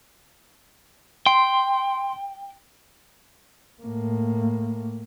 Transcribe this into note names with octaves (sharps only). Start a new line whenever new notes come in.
G5 C6
A2 A#3